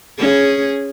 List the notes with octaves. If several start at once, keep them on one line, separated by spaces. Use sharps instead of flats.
C#4 G#4